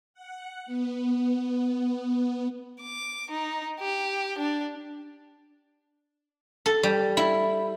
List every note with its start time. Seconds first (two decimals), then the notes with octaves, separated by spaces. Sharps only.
0.14 F#5
0.66 B3
2.82 D6
3.30 D#4
3.80 G4
4.38 D4
6.66 A4
6.83 G3
7.17 E4